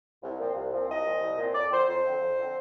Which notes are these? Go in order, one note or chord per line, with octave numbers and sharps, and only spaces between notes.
C2
A#2 F3 C4
C2
A#2 F3 C4
C2 D#5
A#2 F3 C4
C2
A#2 F3 C4
F2 D5
D3 F3 C4 C5
F2 C5
D3 F3 C4
F2
D3 F3 C4